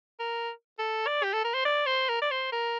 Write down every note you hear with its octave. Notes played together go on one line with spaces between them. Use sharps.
A#4
A4
D5
G4
A4
A#4
C5
D5
C5
A#4
D5
C5
A#4